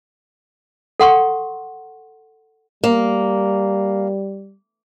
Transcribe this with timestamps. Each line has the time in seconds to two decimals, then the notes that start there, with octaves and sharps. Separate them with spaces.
1.00 A4 F#5 C6 C#6
2.84 G3 A#3